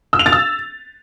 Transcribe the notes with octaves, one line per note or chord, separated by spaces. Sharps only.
E6
F7
A6
E6